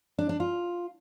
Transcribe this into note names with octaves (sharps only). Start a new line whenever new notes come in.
D4
D4
F4